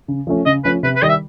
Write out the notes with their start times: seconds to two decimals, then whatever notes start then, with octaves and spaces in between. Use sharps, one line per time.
0.08 C#3
0.27 F3 A3 C#4
0.46 C#3 D#5
0.64 F3 A3 C#4 B4
0.83 C3 B4
0.96 B4
1.02 D#3 G3 D#5
1.09 E5